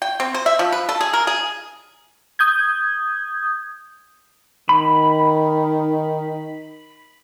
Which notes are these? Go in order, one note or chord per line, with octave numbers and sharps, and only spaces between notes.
G5
C4
C5
E5
F3
B4
A4
G#4
A#4
G#4
D#6 G6 G#6
D#3 B5